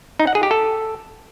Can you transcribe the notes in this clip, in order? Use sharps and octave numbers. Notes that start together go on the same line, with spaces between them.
D#4
F#5
G#4
G4
A4